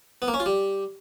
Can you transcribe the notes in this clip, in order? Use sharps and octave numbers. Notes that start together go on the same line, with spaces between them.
B3
A#3
C#4
F4
G3